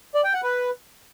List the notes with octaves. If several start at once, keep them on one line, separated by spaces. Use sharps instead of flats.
D5
G5
F#5
B4